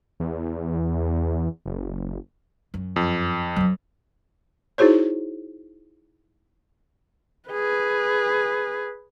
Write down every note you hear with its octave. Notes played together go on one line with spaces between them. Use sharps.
E2
F#1
F#2
F2
F#3 C#4
D#4 E4 F#4 G#4 C5 C#5
G#4 B4